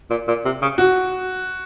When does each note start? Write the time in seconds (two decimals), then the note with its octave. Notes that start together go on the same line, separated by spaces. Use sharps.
0.10 A#2
0.28 A#2
0.45 C3
0.62 C#3
0.78 F#4